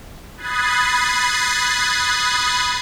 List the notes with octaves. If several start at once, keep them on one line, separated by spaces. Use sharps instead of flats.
B5 D#6 F#6 G#6 A6 C7